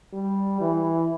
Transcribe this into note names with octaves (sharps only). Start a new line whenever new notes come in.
G3
E3